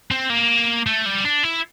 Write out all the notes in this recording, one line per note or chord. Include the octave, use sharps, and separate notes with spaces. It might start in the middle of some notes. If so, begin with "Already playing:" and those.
C4
A#3
A3
G3
D4
E4